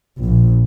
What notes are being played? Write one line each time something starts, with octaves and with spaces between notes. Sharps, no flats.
A#1